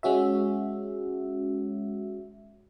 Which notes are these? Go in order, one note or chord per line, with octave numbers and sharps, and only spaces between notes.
G#3 C#4 F#4 E5